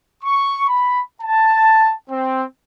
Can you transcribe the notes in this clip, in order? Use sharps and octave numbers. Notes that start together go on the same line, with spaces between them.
C#6
B5
A5
C4